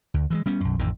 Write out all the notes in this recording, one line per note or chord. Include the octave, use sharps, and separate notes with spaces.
D2
E3 F3 G#3
G3 B3 C#4
B1 F#2
A1 F2 A2 D#3